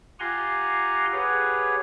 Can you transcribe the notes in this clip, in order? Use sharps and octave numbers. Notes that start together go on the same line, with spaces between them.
F4 G4 F#5 G#5 A#5 C6
G4 G#4 B4 C#5 F#5